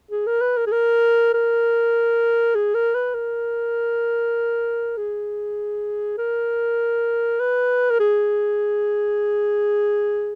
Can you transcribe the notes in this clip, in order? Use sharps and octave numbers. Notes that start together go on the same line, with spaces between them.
G#4
A#4
B4
A#4
G#4
A#4
A#4
G#4
A#4
B4
A#4
G#4
A#4
B4
A#4
G#4